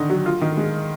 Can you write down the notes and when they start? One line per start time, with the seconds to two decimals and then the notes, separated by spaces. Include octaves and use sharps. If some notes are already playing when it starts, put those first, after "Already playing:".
Already playing: D3 D#3 D#4
0.10 F#3
0.26 F4
0.41 D#3
0.57 G#3